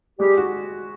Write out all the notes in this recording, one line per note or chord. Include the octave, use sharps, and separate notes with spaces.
G3 G#3 G4
F#4